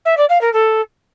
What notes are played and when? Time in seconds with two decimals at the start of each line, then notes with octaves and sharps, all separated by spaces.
0.05 E5
0.17 D5
0.29 F5
0.41 A#4
0.53 A4